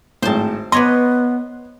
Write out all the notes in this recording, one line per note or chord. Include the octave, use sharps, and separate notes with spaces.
G#1 A2 C5 A5
B3 B4 C#5 D#5 C6 D6